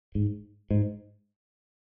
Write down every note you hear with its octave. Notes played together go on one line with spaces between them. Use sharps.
G#2
G#2